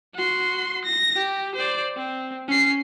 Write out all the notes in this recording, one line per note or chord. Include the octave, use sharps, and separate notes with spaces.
F#4 C6
A#6
G4
C5 D5
C4
C#4 C7